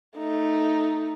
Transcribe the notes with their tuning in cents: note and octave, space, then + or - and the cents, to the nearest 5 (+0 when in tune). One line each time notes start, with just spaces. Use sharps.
A3 +0 D#4 +0